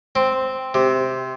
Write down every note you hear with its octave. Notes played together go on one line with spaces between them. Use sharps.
C4
C3